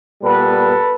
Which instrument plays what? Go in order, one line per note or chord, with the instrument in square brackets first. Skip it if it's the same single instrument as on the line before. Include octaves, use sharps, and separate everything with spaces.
[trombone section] A#2 G3 B3 A4 B4